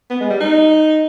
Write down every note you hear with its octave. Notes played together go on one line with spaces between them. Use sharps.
B3
G#3
G3
D#4